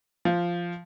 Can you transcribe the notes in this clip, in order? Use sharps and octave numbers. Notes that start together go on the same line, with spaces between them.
F3